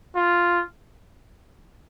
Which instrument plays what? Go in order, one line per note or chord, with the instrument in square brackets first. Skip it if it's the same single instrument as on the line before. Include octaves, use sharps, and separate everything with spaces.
[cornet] F4